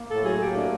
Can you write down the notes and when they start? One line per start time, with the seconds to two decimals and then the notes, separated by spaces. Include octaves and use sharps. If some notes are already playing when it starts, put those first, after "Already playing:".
Already playing: A#3
0.09 A2 A4
0.24 F#3 G#4
0.39 A#3 G4
0.55 A3 D4